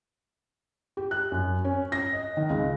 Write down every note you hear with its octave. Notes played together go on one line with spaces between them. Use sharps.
G4
F#6
F#2
C#4
A#6
D#5
D#3
C#2